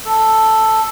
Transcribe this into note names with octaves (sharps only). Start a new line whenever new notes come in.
A4